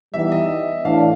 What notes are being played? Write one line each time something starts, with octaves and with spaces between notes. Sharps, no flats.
E3 G3 B3 D#4 G4 E5
D#5
A2 E3 A3 D4 F5